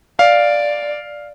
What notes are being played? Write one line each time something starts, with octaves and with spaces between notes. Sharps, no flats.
D5 F5